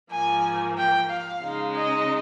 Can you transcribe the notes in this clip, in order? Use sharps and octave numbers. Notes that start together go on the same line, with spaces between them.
G#2 F3 A#3 G#5
G5
F5
C#3 G#3 D#4
D#5